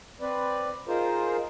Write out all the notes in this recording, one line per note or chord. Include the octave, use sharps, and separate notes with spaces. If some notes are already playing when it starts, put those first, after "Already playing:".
C4 B4 D5
D#4 F4 G#4 A#4 C5